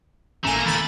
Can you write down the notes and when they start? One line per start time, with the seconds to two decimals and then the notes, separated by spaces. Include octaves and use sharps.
0.45 G#1 A2 A3 A#3 C#4 G#5 A#5
0.66 D1 D3 E3 B5 A6